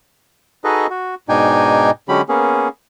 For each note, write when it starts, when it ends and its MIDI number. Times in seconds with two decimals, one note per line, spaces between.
0.64 0.87 63
0.64 0.87 66
0.64 0.87 68
0.64 0.87 69
0.64 0.87 71
0.64 0.87 75
0.90 1.15 66
1.29 1.91 44
1.29 1.91 47
1.29 1.91 62
1.29 1.91 63
1.29 1.91 79
1.29 1.91 80
2.09 2.22 50
2.09 2.22 54
2.09 2.22 56
2.09 2.22 61
2.09 2.22 67
2.09 2.22 83
2.29 2.68 58
2.29 2.68 59
2.29 2.68 61
2.29 2.68 68